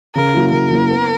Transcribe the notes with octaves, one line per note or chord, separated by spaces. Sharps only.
C#3 A#4
F#3 A#3 E4
C#3 A#4
F#3 A#3 E4
B3